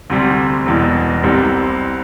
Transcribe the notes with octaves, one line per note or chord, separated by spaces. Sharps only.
D2 C3 G3
E1 E2 B2
C2 C3 G3 C4